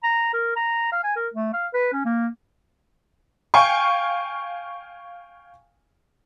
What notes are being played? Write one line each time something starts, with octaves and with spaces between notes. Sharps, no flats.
A#5
A#4
A#5
F5
G#5
A#4
A3
F5
B4
C#4
A#3
F5 G5 G#5 C#6